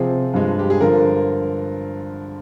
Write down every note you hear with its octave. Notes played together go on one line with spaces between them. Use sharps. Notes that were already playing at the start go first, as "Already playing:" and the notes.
Already playing: C3 F3 C4 G#4
G2 F3 G#3
G4
G#4
G2 D3 F3 A#4